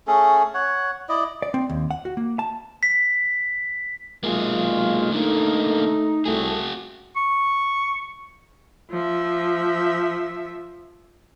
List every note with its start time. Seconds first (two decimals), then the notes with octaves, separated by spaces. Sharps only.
0.07 A3 C#4 G#4 A4
0.54 C#5 F#5
1.09 E4 D5 D#5
1.42 D5
1.54 C4
1.70 D#2
1.91 F#5
2.05 F#4
2.17 A#3
2.39 A5
2.83 B6
4.24 B1 G#3 A#3 F4 G#4
5.12 D3 A3 A#3 D#4
6.26 C2 A3 F#4 G#4
7.16 C#6
8.91 F3 E5